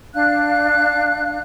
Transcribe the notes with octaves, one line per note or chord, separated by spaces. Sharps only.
D4 F5 F#6